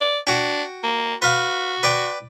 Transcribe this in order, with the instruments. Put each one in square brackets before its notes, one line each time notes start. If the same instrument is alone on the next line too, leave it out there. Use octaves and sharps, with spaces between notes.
[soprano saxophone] D5
[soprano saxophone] D4 [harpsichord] F#4 G5
[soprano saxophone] A#3
[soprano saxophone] F#4 [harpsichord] B4 F5 B5
[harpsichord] B4 D5 G5